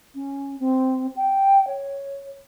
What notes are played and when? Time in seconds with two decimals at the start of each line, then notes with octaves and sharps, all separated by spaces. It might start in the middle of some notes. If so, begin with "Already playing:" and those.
0.15 C#4
0.60 C4
1.16 G5
1.67 C#5